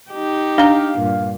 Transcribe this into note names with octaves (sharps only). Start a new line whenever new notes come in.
D#4 G4
D4 F5 A#5
G2 A#2